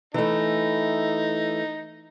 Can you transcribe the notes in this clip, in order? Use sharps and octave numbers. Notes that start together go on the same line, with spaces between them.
E3 A3 D#4